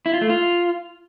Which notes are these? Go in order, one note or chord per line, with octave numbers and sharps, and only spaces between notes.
E4
F4
A3
F4